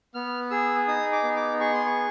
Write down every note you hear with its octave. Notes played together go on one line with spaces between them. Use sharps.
B3 F6
G#4 E6
D#4 D#6
D6
B3
D6
G#4 C#6
C6
C#6